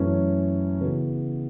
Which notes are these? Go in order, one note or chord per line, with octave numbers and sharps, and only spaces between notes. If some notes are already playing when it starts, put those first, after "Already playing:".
Already playing: F#2 E3 A3 C#4
C#3 E3 B3 F#4